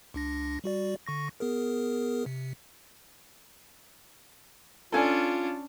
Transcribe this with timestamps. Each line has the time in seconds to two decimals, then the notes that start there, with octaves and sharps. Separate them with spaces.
0.14 C#2 D4 A#6
0.64 G3 F#4 D5
1.06 D3 C#6 A#6
1.40 B3 G#4 A#4
2.26 C3
4.92 C#4 D4 F4 A4 G#5